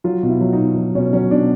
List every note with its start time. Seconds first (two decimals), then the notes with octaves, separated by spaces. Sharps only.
0.04 F#3 F4
0.22 B2
0.29 E4
0.41 F#3
0.53 D#4
0.59 B2
0.77 F#3
0.95 B2 C#4
1.13 F#3 C#4
1.31 B2 D4